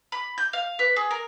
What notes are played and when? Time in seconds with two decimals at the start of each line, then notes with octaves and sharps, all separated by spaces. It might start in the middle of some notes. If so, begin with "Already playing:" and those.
0.12 B5
0.38 G6
0.53 F5
0.79 B4
0.96 G#4
1.11 A#4